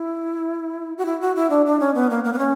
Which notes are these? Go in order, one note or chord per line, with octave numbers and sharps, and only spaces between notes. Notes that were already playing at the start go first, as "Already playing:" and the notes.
Already playing: E4
F#4
E4
F#4
E4
D4
D4
C#4
B3
A#3
A#3
B3
C#4